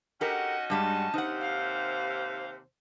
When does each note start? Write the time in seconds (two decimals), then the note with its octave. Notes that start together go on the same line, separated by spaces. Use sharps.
0.21 C#4 D#4 F#4 G4 A4 A#4 F#5
0.70 G2 G3 G#3 A5
1.14 D#2 C3 D#4 C5 F#5
1.40 F5